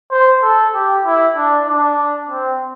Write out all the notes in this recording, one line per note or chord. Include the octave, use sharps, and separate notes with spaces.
C5
A4
G4
E4
D4
D4
C4